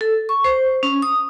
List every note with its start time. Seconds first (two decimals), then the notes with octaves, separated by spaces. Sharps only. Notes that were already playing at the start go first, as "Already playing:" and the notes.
0.01 A4
0.29 C#6
0.45 C5
0.83 C#4
1.02 D#6